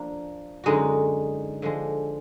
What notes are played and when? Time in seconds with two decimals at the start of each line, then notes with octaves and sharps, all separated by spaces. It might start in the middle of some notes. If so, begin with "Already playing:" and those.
Already playing: F3 A#3 D4
0.64 F#2 D3 G#3 D#4 F#4
1.62 D3 F3 G#3